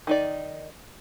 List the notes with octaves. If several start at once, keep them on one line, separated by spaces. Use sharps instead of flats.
D#3 D#4 D5